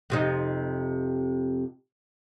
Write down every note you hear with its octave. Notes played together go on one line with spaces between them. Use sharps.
F2 C3 D#4